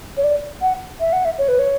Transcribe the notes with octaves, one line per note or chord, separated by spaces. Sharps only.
C#5
D5
F#5
E5
F#5
E5
C#5
B4
C#5